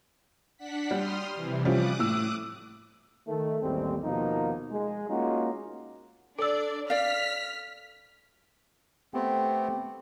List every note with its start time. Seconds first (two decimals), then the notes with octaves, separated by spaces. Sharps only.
0.57 D4 F#5 B6
0.91 G3 C6 D#6 F6
1.35 C3 E3
1.65 F3 G3 C#4 D6 D#6 F#6
1.99 A2 E6
3.28 D#3 A3
3.62 A1 D#2 G3 G#3 C4
4.04 D#2 B2 F3 A#3 D#4
4.71 G#3
5.09 G#3 A#3 C#4 D#4 F4 F#4
6.39 D4 A4 D5 E6
6.90 D5 F5 F6 B6
9.14 A3 B3 C4 G4